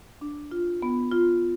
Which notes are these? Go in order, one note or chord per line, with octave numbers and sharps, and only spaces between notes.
D4
F4
B3
F4